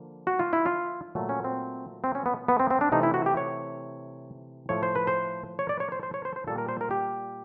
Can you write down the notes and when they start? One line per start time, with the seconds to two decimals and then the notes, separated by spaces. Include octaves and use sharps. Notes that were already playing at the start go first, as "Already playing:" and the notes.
Already playing: D3 F3 A#3
0.27 F#4
0.39 F4
0.53 E4
0.66 F4
1.15 A#2 F#3 A3
1.29 C#4
1.44 C4
2.04 C4
2.15 C#4
2.26 B3
2.48 B3
2.60 C4
2.71 C4
2.81 D4
2.92 C3 E3 A3 D#4
3.03 E4
3.14 F#4
3.26 G4
3.37 C#5
4.69 A2 F3 A3 C#5
4.83 C5
4.95 B4
5.07 C5
5.59 C#5
5.69 D5
5.80 C#5
5.92 C5
6.03 C5
6.14 C#5
6.25 C5
6.36 C5
6.47 A#2 G3 A#3 A4
6.58 A#4
6.69 C5
6.81 A#4
6.91 G4